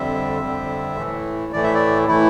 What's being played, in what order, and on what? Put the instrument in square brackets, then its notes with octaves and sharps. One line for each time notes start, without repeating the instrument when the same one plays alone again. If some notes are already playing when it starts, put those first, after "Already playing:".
Already playing: [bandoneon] F2 D3 G3 C4 E5
F2 D3 G3 C4
A2 E3 A3
A2 E3 A3 D5
E5
D5
A2 E3 A3 E4